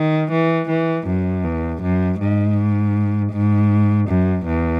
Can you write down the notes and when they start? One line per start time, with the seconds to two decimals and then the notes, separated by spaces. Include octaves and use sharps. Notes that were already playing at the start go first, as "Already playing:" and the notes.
Already playing: D#3
0.31 E3
0.69 E3
1.07 F#2
1.44 E2
1.82 F#2
2.20 G#2
3.33 G#2
4.09 F#2
4.47 E2